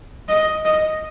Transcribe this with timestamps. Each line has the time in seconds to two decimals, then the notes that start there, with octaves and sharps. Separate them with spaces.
0.29 D#5
0.65 D#5